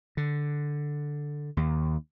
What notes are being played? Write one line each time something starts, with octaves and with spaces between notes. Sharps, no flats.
D3
D#2